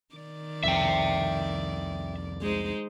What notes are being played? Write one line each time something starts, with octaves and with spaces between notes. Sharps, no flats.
D#3 D5
C2 F2 E5 G5
G#3 D#4 C5